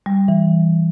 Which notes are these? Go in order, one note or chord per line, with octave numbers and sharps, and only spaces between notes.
G3
E3